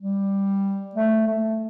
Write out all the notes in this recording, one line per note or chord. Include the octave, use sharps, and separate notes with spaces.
G3
A3
A3